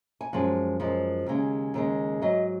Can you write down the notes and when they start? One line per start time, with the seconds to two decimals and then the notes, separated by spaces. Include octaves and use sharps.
0.21 G#5
0.33 F#2 F3 G#3 F#5
0.80 F#2 F3 G#3
1.26 D#2 C#3 G#3
1.74 D#2 C#3 G#3
2.22 G#2 F#3 D#5